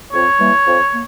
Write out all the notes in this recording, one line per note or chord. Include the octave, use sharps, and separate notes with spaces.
F2 C#5
E3 G3 A#3
F2
A#3